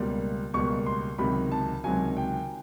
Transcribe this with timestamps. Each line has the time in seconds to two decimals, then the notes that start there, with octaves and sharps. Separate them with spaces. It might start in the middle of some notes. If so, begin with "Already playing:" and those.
Already playing: C#2 B2 G3 A#3
0.54 C#2 B2 G3 A#3 C#6
0.86 C6
1.18 C#2 C3 D#3 F#3 B5
1.52 A5
1.84 C#2 C3 D#3 F#3 G#5
2.17 G5